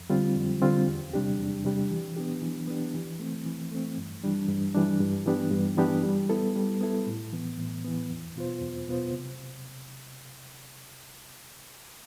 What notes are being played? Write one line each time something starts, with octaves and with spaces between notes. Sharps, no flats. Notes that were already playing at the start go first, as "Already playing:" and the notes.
Already playing: F2
D3 G3 C4 F4
F2
D3 G3 C4 F4
E2
C3 G3 D4 G4
E2
C3 G3 D4 G4
E3
B3 D4 G4
E3
B3 D4 G4
E3
A3 C4
E3
A3 C4
G2
E3 G3 D4
G2
E3 G3 D4
G2
E3 B3 D4 G4
G2
E3 B3 D4 G4
G3
B3 E4 A4
G3
B3 E4 A4
A2
E3 B3
A2
E3 B3
E2
B2 B3 F4 C5
E2
B2 B3 F4 C5
C3